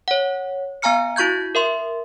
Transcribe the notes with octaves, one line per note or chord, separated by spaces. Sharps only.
C#5 F#5
B3 F5 G#5 A#5 F6 C#7
E4 F#4 C#6 G6 G#6
A#4 E5 C6